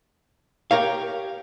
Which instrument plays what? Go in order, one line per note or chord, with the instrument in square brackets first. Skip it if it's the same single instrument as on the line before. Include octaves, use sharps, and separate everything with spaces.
[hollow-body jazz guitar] G4 A#4 C#5 F5